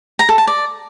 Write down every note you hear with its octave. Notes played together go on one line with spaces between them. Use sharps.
A#5
A4
A5
D5